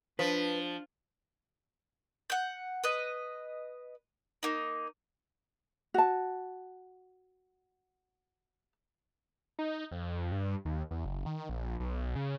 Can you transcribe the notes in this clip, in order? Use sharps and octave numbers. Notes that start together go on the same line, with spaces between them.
F3 D4 B4
F#5 G6
B4 D#5
A#3 D#4
F#4 A5
D#4
F2
G2
D#2
E2
F#1
D#3
A#1
B1
C#3